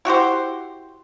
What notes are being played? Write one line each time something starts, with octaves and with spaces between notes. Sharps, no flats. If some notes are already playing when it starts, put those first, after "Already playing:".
E4 F#4 G4 C5